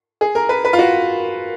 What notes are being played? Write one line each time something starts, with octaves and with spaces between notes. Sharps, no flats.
G#4
A#4
B4
B4
F4
F#4